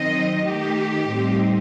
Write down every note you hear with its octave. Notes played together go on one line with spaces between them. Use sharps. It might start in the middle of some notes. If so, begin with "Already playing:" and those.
Already playing: D#3 F#3 C4 D#4 D#5
D#3 A3 D#4 G4
A2 G3 C4 D#4